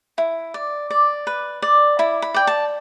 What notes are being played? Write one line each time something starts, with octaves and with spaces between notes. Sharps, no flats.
E4
D5
D5
B4
D5
E4 B5
B5
D5 G5
A5